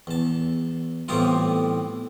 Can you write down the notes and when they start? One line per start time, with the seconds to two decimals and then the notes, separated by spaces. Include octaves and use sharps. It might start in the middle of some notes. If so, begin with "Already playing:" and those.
0.07 E2 A5
1.08 A2 E3 G3 B3 C4 F4